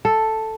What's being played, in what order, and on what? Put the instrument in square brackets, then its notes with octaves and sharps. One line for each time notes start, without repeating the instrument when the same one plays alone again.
[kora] A4